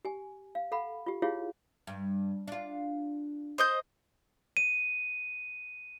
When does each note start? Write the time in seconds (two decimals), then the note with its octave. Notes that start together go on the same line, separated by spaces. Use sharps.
0.05 G4 G#5
0.55 F5
0.72 A4 F5 F#5 B5
1.06 F4 G4
1.22 E4 F4 G4 G#4 C#5 F5
1.87 G2
2.48 D4 F4
3.58 C5 D#5 G6
4.57 D#7